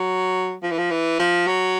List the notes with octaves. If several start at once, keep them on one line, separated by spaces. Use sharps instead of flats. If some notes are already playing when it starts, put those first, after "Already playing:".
Already playing: F#3
F3
E3
F3
E3
F3
F#3